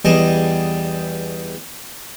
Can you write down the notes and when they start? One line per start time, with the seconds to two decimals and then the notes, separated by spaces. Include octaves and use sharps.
0.05 E2 G3 G#4 D#5 A5